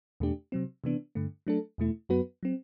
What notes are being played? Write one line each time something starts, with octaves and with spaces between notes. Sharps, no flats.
E2 B2 A3 D4 G4
C3 F#3 C4
C3 E3 B3 D4
G2 D3 A3
F#3 A3 D4 A4
E2 B2 A3 E4
F#2 F#3 B3 F#4 B4
F#3 C4